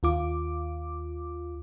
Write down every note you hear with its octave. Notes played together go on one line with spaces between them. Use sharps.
D#2 F4 D6